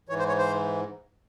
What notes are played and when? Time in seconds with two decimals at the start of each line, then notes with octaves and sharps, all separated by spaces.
0.09 G#2 E3 C#5
0.19 C5
0.28 C#5
0.38 C5